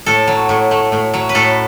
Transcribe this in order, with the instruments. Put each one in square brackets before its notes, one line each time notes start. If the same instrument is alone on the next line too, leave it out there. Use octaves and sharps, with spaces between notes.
[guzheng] A2 A4
F#3
A2
A3
A2
F#3
B4
A2 A4